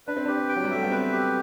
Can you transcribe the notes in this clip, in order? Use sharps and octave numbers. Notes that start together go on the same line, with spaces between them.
D4 B4
C4
D4 G4
G5
F#3
G3
A3 E5
B3
C4 B4
G4